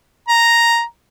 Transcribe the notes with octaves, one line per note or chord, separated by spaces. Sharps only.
A#5